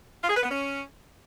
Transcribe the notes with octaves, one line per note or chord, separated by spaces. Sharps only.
F4
G#4
B4
B3
C#4